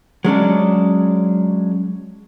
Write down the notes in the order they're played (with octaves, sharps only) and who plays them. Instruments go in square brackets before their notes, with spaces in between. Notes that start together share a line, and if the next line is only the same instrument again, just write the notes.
[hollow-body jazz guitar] F#3 G#3 C#4 D4